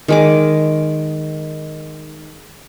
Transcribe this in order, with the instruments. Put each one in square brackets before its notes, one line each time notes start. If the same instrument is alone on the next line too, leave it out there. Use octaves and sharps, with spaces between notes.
[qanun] D#3 G#3 D6